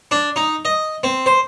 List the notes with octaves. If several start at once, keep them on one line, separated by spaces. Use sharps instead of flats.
D4
D#4
D#5
C4
C5